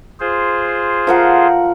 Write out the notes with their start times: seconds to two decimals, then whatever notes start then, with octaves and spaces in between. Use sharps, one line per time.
0.20 F4 G#4 C5
1.07 F3 A#4 F#5